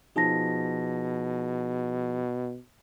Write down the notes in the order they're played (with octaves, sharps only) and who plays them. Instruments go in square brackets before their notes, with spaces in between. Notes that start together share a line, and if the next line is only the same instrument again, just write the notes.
[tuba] B2 [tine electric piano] F3 F4 G#4 [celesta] D#4 A5 A#6